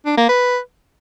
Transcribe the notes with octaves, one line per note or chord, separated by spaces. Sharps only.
D4
A#3
B4